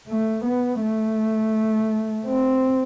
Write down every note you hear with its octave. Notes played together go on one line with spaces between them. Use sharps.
A3
B3
A3
C4